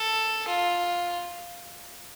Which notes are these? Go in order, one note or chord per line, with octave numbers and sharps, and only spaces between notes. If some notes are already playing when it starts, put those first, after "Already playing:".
Already playing: A4
F4